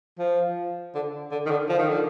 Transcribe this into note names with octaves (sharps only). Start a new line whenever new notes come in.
F3
D3
D3
D#3
D3
F3
D#3
D3